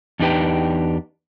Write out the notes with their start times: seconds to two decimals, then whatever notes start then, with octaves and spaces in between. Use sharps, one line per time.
0.20 E2 D4 D#4 G4 B4 G5